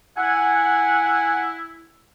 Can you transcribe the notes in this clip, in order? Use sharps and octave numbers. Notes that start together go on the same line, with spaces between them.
E4 F#5 G#5